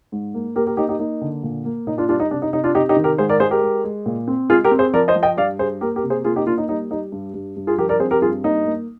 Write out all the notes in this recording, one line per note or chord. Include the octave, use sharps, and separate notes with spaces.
G#2
A#3
A#3 G4 A#4
G4 A#4
A#3 D#4 G4
D#4 G4
A#3 D#4
D3
A#2
A#3
A#2 D#4
D4 F4
G3 D4 F4
D#4
C3 D4
D#4
C3 D#4
D4 F4
C3 D#4 G4
D#4 G4
D#3
G4 A#4
G#2 G#4 C5
A#4 D5
G#3 G#4 C5
G4 A#4
G#3
G#3
A#2
C4
G#3 F4 G#4
G4 A#4
C4
G#4 C5
F3 A#4 D5
C5 D#5
F3
D#5 G5
G2 D5 F5
G2 G#4 C5
A#3 G4 A#4
G4 A#4
C3
G#4 C5
A#3 F4 G#4
D#4 G4
A#3 D4 F4
D#4
G3 D#4
G3 D#4
G2
G2
G2
F4 G#4
F3 G4 A#4
A#4 D5
C4 G#4 C5
G4 A#4
G2 F4 G#4
A#3 D#4
A#3